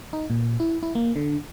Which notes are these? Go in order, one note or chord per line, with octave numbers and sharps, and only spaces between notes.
D#4
A#2
E4
E4
A#3
D3